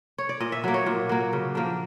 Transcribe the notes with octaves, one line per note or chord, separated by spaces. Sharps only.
C#5
D5
A#2 D#5
E5
F#3 A#3
C#5
A#2
F#3 A#3
C#3
F3 A#3 D4